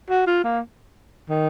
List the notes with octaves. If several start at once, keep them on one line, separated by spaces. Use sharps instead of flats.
F#4
F4
A#3
D#3